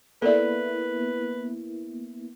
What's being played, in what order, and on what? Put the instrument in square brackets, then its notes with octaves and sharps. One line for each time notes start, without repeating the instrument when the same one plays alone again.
[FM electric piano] A#3 B3 E4 [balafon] A4 D5 [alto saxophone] B4